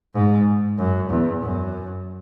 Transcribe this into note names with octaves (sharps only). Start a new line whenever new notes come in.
G#2
F#2
E2
F#2